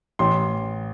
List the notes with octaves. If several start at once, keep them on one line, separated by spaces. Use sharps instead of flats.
A1 C6